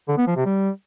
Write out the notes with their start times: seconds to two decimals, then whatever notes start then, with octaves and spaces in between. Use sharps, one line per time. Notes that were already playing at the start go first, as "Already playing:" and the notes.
0.08 D3
0.18 B3
0.27 F3
0.36 C3
0.46 G3